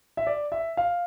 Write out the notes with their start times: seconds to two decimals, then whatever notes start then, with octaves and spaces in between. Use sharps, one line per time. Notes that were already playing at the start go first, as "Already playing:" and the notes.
0.17 E5
0.27 D5
0.52 E5
0.77 F5